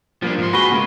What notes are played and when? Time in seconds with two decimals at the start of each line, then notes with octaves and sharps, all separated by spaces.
0.22 F3 G3 A#3 D4
0.38 G#2 C6
0.53 F#4 G#4 B4 B5 C#6 G7
0.71 C#3 G#3 A#3